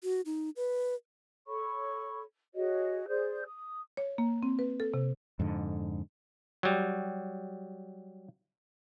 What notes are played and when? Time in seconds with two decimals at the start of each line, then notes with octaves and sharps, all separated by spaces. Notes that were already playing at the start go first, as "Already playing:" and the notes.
0.03 F#4
0.26 D#4
0.56 B4
1.46 A4 C#5 B5 C#6
2.55 F#4 G#4 C#5 D#5
3.08 G#4 C5 D5 G6
3.45 D#6
3.97 C#5
4.18 A#3
4.43 C4
4.59 B4
4.80 A4
4.94 C3
5.39 F2 G#2 D3
6.63 F#3 G3